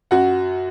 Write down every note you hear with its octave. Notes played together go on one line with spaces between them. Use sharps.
F#2 F#4 F#5